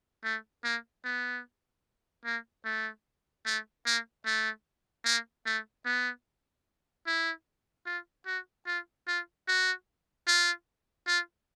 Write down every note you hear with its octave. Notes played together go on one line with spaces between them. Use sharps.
A3
A#3
B3
A#3
A3
A3
A#3
A3
A#3
A3
B3
E4
F4
F#4
F4
F4
F#4
F4
F4